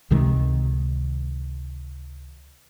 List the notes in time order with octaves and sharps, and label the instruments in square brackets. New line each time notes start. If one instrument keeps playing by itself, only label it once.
[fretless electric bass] C#2 C3 D#3 G#3